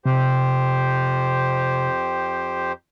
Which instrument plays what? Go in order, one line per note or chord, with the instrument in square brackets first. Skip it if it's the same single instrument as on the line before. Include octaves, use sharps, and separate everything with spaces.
[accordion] F2 G4 C5 [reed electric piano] C3